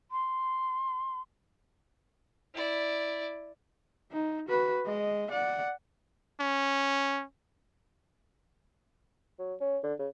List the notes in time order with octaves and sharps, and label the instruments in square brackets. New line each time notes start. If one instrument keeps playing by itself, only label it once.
[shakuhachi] C6
[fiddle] E4 D5
[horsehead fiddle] D#4
F#4 B4
G#3 D#5
D5 F#5
[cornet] C#4
[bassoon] F#3
C#4
D3
C#3